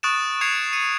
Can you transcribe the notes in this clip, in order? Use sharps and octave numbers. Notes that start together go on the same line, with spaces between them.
C#6 D#6 F#6 A6 D7 E7
C#6 G#6 C7 C#7 F7
C#7 D#7